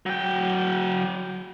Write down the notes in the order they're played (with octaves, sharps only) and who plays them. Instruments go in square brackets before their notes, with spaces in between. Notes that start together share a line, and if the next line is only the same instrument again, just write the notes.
[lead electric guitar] F#3 G5